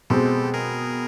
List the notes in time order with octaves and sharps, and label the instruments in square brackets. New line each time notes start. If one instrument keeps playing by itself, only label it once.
[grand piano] B2 G#3 C4 [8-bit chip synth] G4 A4
[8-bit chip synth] G#4 A#4